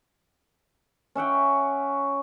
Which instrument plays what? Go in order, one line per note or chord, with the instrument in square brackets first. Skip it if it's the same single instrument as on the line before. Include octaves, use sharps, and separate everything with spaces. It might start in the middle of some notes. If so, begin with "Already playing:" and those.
[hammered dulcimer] C#4 E5 F#5 G5